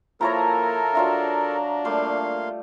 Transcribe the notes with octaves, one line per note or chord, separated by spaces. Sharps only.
F3 A#3 E4 A4 A#4 C#5 A#5
F#3 D4 F4 E5
G3 A3 A#3 F5 C6